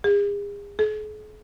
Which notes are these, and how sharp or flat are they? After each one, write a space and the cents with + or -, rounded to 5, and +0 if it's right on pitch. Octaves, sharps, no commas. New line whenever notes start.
G#4 -40
G#4 +45